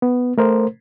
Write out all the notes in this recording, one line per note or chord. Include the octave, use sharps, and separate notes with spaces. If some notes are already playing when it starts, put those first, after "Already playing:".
B3
A3 A#4 C5